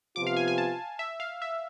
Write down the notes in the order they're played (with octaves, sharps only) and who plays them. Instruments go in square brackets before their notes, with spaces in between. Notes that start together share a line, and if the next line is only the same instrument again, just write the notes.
[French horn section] C3 F3 B3 F4 [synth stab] D6
[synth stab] F5
G#5
G#5
A5
E5
F5
E5